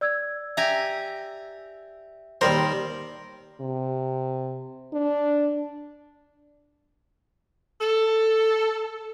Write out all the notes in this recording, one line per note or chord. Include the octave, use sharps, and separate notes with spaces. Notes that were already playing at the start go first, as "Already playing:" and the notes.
D5 E6 G#6
G4 E5 G#5 A#5
D#2 G3 A#4 C5
C3
D4
A4